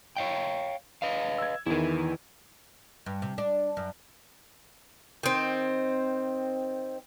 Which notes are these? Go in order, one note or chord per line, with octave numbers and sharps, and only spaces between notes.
C#5 F5 G5
B4 D#5 F5
E6 G#6
E2 D#3 E4 B4
G2
C3
D4
F#2
D#3 C4